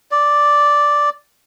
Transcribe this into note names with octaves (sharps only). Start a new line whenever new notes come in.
D5